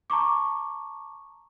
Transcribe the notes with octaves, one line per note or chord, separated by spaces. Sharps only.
A5 A#5 C#6 D6